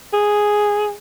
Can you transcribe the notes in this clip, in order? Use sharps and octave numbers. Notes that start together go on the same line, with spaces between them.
G#4